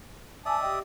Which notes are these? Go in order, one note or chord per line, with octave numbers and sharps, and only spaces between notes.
D5 E5 G#5 A5 D#6
G4 D#5 G5